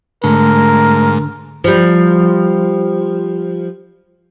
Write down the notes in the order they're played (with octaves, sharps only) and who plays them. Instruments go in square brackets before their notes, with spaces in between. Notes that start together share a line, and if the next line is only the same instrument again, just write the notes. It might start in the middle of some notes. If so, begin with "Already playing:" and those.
[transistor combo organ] G#2 [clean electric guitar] D3 [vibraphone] A3 [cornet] A#4
[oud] F3 G3